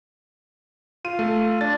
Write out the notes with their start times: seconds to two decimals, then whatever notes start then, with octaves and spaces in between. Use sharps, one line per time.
1.05 F4 D#7
1.19 A3
1.61 D4 A6